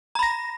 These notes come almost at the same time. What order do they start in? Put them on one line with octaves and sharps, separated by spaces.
A#5 B5 A#6